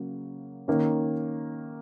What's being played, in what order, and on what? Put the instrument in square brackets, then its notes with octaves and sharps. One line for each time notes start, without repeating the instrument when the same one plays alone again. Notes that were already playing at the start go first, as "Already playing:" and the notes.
Already playing: [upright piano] C#3 F#3 A#3
D#3 A#3 C#4